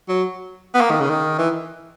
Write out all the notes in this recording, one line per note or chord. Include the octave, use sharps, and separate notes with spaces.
F#3
B3
A#3
D#3
C#3
D#3
E3